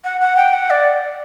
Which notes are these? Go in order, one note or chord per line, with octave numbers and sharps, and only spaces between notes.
F#5
F#5
G5
F#5
D5